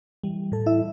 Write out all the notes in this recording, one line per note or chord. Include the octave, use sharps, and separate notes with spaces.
E3 G3
A2 A4
E4 E5